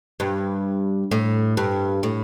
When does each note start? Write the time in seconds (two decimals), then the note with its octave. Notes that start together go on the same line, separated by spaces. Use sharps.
0.20 G2
1.11 A2
1.57 G2
2.03 A2